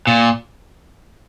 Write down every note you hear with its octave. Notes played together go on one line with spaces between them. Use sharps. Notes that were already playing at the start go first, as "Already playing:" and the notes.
A#2